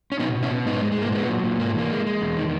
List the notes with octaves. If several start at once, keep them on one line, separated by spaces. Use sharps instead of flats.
C#4
B2 B3 D#4
B2
C#4 E4
B2
G#2 B3 D#4
G#3
G#3
G#2 A#3
A#2 G#3 B3
F#3
A#2
G#2 A#3
G#3
E3 A#3
G#3
G#3
E2
D#3